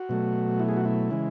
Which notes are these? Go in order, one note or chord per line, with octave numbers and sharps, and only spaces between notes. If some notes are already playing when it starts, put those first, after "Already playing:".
Already playing: F#4
B2 F#3 A3
E4
G#4
F#4
E4
C#3 E3 G#3